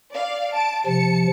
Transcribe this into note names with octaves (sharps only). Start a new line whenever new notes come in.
D5 F5
A5 D7
C3 F3 A5 C#7